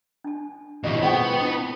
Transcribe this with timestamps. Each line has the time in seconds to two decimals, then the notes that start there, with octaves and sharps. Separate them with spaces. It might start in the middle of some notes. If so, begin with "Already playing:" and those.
0.24 D4 A5
0.84 D#2 B2 E4 G4 D#5
1.02 B3 F4 G#4 C5 F#5 G5 C#6
1.40 D4 E4